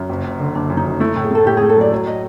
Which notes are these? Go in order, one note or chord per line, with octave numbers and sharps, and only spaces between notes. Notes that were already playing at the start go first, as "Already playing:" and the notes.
Already playing: F#2 C#4
F#1
F#1
D3
F#1 D4
F#2
D#4
F#2
A3 E4
A2
G#4
A3 A4
A2 G4
A3 G#4
A4
F#3 D5
F#3
D#5